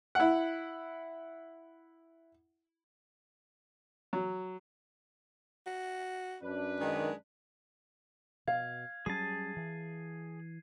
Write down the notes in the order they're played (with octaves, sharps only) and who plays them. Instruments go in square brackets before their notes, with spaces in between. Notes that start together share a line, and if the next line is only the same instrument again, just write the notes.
[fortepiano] E4 F#5
F#3
[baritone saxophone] F#4
[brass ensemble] F#2 D4 B4
[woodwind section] D#3 [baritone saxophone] G#3
[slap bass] B2 [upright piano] F5 [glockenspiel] G#6
[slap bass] F#3 G3 C#4 [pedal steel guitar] G#4 A5 [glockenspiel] C7 D#7
[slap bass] E3